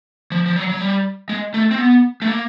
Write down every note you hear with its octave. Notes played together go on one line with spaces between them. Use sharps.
F3
F3
F#3
F#3
G3
G#3
A3
C4
B3
A3
A#3